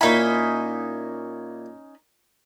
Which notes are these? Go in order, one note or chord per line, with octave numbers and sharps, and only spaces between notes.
A#2 C#4 D#4 E4 B5